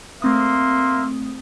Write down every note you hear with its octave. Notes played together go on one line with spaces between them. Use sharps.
A3 A#3 C4 E5 C6 D#6